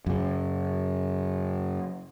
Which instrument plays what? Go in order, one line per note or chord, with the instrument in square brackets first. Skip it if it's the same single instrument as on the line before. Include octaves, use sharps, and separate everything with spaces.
[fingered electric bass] F#2 C#3